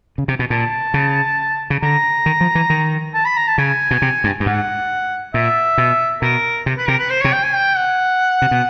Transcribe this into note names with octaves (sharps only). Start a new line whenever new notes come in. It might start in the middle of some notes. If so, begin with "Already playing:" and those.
C#3
C3
B2
A#2 A5
C#3
C#3
D3 A#5
D#3
F3
E3
D#3
A5
B5
A#5
A5
C#3 G#5
B2
C3
G2
G2
G#2 F#5
A#2 E5
B2
B2 A#4
C3
B4
C3 A#4
B4
C5
C3 C#5
G5
G#5
G5
F#5
C3
B2